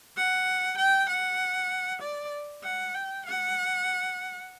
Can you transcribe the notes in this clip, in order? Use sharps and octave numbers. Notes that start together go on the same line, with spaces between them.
F#5
G5
F#5
D5
F#5
G5
F#5